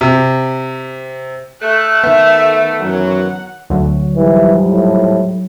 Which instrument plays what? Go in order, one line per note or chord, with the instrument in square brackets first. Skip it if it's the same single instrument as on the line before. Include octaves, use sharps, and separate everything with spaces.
[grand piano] C3
[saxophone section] A3 [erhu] F#6
[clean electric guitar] D#3 B3 [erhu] E5
[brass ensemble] F#2 E3 F#3 [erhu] F#5
[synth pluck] D2 D3 [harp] F#3
[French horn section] G#2 F3 G3 [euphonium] E3
[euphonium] A2